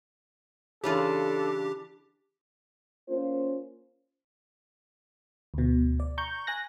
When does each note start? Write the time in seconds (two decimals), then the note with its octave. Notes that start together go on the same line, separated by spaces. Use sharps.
0.84 C#3 E3 D4 F4 G4 A4
3.08 A#3 C#4 F4 C5
5.54 D2 B2
6.00 D5
6.18 A#5 C#6 G6
6.47 G#5 F#6 A#6